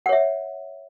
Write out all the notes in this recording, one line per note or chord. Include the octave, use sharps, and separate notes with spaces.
C#5 E5 F#5